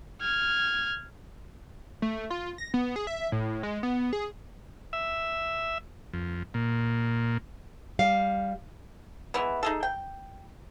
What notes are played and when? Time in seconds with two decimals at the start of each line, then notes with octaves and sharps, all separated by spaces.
0.22 F6 G#6
2.02 A3
2.30 F4
2.58 A#6
2.74 B3
2.96 G#4
3.07 E5
3.32 A2
3.63 G#3
3.83 B3
4.13 G#4
4.93 E5
6.14 F2
6.54 A#2
7.99 G3 F5
9.34 E3 G#3 B3
9.63 D#4 G#4 A4
9.83 G5